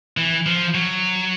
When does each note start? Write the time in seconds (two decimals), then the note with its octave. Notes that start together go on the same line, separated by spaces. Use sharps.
0.17 E3
0.46 F3
0.74 F#3